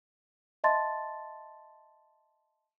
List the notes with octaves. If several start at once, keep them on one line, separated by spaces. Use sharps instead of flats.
D#5 E5 A5 C6 A6